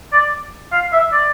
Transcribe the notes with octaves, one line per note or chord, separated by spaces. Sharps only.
D5
F5
E5
D5